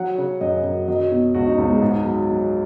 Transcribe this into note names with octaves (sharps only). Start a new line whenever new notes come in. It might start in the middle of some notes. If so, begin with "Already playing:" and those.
Already playing: F#3 F#5
C#3
F#2 D#5
F#2
F#3 D#5
B2
C#2 F#4
D#4
C#2 B3
G#3
G#2
F#3
F#3